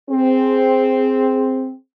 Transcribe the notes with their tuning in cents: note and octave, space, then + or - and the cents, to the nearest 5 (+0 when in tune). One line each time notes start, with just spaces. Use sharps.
C4 +0 G#4 +0